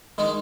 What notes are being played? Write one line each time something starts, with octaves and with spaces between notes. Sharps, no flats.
D#3 G#3 D#4